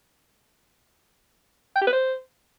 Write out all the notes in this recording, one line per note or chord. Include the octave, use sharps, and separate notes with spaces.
G5
G4
B4
C5